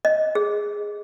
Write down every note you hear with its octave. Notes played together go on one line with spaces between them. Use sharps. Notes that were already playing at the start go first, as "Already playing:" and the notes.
D#5
G#4